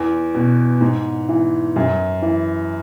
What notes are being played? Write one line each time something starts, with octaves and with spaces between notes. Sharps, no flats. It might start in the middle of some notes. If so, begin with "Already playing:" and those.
Already playing: E2
B2
G#2
E3
F#2
E3